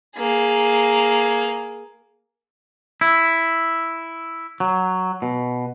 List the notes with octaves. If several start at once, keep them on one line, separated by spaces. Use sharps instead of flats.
A#3 G#4
E4
F#3
B2